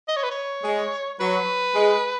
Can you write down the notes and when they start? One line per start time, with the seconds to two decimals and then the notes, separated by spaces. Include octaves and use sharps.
0.08 D#5
0.16 C#5
0.23 B4
0.31 C#5
0.63 G#3
1.20 F#3 B4
1.74 G#3